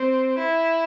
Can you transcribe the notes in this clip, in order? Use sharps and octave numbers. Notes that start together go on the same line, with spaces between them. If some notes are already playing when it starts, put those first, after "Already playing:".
Already playing: C4
E4